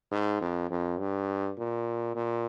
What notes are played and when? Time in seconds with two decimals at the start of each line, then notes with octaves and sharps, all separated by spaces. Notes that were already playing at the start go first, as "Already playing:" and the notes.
0.11 G#2
0.41 F2
0.71 F2
1.00 G2
1.58 A#2
2.15 A#2